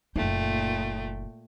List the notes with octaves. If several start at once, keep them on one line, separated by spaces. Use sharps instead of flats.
F#1 A#2 A3 D#4 G5